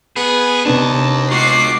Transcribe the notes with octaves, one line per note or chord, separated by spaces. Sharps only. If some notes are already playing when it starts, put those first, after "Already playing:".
B3 G#4
D#2 C3 B3 D4 A5
G#3 F4 F#4 D6 C7